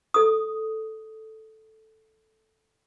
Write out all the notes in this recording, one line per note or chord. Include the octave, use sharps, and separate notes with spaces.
A4 D#6